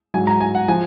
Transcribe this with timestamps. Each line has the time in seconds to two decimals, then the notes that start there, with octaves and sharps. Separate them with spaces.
0.14 G#2 F#3 G#5
0.27 A#5
0.41 G#5
0.55 F#5
0.68 F3 G#5